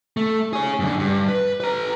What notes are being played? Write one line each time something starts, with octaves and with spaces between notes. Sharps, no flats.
A3
G#4 C#5
F#2 D3
G2
B4
B4 A#5